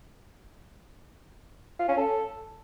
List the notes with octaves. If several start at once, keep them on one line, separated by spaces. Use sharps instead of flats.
F4
C#4
A4